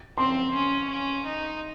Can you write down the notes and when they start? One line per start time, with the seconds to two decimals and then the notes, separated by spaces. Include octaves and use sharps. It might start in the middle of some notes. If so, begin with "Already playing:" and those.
0.18 C4 C6
0.54 C#4
0.90 C#4
1.26 D#4